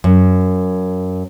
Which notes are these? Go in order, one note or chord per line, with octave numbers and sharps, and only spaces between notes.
F#2